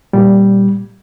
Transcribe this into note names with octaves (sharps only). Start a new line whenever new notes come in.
A#2 G3